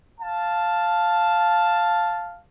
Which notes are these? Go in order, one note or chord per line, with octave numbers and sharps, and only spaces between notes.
F5 A5